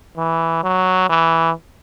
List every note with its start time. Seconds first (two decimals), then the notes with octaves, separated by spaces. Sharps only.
0.17 E3
0.63 F#3
1.09 E3